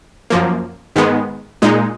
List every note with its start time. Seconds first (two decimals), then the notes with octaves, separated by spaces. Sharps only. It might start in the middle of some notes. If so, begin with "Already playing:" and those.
0.30 F#2 F3 A#3
0.96 G#2 D#3 G#3 B3
1.62 A#2 G#3 D#4